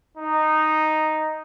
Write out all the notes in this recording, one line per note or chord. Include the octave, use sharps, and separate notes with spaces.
D#4